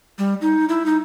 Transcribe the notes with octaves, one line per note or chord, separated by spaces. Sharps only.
G3
D#4
E4
D#4